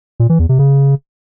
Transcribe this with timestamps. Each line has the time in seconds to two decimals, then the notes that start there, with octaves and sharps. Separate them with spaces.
0.20 A#2
0.29 E3
0.39 E2
0.49 C3
0.59 C#3